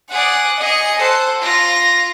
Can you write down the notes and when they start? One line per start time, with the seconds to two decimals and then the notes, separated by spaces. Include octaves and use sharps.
0.11 G#4 D5 F#5
0.60 G#4 D#5 C#7
0.99 A4 C5 F#5
1.42 F4 A#6